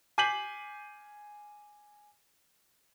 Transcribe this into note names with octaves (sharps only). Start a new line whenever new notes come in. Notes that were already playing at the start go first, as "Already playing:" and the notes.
G#5 D6 G6 B6 C7 F#7